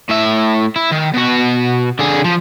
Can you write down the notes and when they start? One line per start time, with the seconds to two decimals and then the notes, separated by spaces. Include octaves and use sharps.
0.09 A2 E5
0.76 E4
0.92 D#3
1.14 B2 F#4
1.99 D3 G#4
2.24 F3